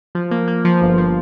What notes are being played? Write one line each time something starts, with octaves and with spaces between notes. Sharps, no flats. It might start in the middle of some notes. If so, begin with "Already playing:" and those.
F3
A#3
A#3
F3
G1
F3